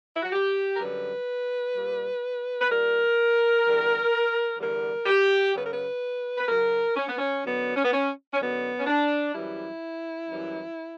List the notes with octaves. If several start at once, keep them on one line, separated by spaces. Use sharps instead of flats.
E4
F#4
G4
A#4
F#2 D3 G3 B4
A#2 G3
B4
A#2 G3 A#4
E2 D3 G3
E2 D3 G3 A#4
G4
F#2 C#3 F#3 B4
A#4
B4
B4
F#2 C#3 F#3 A#4
C#4
B3
C#4
F#2 D3 F#3 B3
C#4
B3
C#4
C#4
F#2 D3 F#3 B3
C#4
D4
F#2 E3 G3 E4
F#2 E3 G3